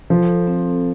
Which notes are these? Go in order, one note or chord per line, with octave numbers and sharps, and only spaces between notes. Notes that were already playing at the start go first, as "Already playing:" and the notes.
F3 A4
C4